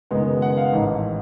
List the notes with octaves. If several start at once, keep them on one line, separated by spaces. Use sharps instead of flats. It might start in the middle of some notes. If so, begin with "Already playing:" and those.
F#1 F#2 D#3 G#3 B3
F#5
F5
A1 G#2 D#3